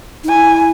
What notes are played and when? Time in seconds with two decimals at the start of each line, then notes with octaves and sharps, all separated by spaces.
0.24 D#4
0.28 E4 G#5